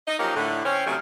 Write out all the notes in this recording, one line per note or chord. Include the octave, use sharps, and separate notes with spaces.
D#4 D#5
F3 F#3 A#3 C#4 D#4 G4
A2 D3
C4 C#4
C3 D#3 F#3 G3 A3 C#4